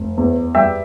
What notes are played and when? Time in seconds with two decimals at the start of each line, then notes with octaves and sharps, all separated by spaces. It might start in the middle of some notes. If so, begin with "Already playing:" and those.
Already playing: F1
0.18 E2
0.55 G3 E5 G5